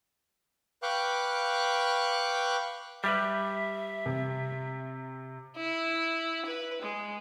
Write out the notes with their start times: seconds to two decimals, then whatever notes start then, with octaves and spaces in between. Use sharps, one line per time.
0.83 B4 F5 G5 C#6 D6 F#6
3.04 G3 G4 B4 E5
4.06 C3
5.57 E4
6.45 B4
6.82 G#3